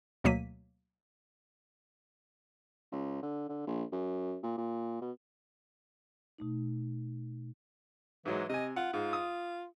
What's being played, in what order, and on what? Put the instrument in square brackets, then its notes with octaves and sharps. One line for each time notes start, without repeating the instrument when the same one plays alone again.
[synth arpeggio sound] D2 B2 F#3 A#3 B6 D#7
[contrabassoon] C#2
D3
D3
A#1
F#2
A#2
A#2
B2
[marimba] B2 A3 D#4
[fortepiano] G#2 F#3 G#3 [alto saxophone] E3
[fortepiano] C3 G#5 [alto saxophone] D#5
[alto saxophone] F4 [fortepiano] F#5
[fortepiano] G#2 [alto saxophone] F4
[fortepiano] D#6